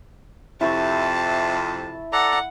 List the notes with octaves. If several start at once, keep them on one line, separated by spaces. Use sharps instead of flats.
F2 C3 E4 A5 C#6
A4 D5 F#5 A#5